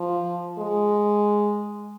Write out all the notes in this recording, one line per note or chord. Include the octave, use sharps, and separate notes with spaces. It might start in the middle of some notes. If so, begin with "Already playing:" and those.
Already playing: F3
G#3